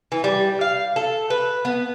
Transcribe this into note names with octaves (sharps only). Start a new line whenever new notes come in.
E3
G3
F5
A4
B4
B3